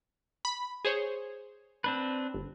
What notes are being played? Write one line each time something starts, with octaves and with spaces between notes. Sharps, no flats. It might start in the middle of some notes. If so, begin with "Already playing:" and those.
B5
G#4 C5 C#5
C4 D4 B4
G1